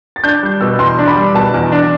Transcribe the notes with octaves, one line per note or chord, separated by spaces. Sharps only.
A6
D4 G6
G3
B2 E6
E2 C6
D4
B5
G3
B2 A5
E2
D4